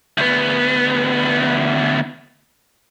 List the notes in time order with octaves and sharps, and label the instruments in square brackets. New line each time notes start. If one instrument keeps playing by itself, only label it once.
[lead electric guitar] D2 B3